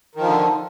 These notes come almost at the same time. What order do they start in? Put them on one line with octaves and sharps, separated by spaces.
D#3 F3 D3